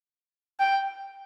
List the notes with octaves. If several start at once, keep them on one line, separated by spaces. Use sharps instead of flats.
G5